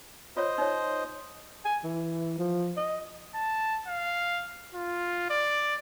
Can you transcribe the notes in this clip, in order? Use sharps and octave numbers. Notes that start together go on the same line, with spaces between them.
F4 C5 C#5 D#5
D#4 C#5
G#5
E3
F3
D#5
A5
F5
F4
D5